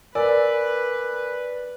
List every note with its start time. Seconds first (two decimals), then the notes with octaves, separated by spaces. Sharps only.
0.15 A#4 B4 D5 G#5 E6